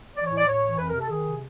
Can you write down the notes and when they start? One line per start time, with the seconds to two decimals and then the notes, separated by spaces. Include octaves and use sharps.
0.16 E3 D5
0.27 C#5
0.32 A2
0.37 D5
0.47 A2 C#5
0.63 E3
0.79 F2 B4
0.89 A#4
0.94 C3
1.00 A4
1.10 D#3 G#4
1.26 C3